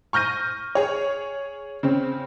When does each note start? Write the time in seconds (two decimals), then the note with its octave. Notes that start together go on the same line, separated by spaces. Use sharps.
0.13 C#6 F6 G6 A#6 D#7
0.75 G#4 C#5
1.83 C#3 C4 C#4